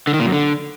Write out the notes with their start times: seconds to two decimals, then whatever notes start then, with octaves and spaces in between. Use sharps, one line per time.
0.07 D3
0.14 D#3
0.20 A#2
0.26 F#2
0.32 D3